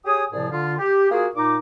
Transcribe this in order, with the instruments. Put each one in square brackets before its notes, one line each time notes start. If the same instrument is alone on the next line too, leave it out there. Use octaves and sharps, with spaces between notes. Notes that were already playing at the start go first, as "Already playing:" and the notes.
[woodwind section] G4 G#4 C#5 G#5 D#6
C2 A2 C3 F3 G#4 D5
D3 F4
G4
A#3 F4 F#4 G#4
A#2 D#4 D6